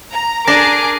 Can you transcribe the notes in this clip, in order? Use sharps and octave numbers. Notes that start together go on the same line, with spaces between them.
A#5
D4 G#4 A#4 D6 A#6